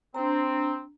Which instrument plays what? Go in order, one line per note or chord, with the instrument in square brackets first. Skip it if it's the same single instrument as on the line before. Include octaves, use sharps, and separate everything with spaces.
[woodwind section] C4 [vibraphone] D4 A#5